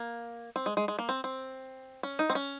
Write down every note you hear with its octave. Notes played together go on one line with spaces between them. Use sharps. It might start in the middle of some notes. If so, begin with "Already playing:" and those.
Already playing: A#3
C4
G#3
G#3
G#3
A#3
C4
C4
C#4
D#4
C4
C#4